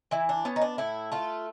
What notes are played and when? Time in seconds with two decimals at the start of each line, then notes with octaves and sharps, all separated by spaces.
0.11 E3 E4
0.29 D4
0.45 B3 C#4
0.56 D#4
0.61 D4
0.78 A2 E4
1.12 A3 F4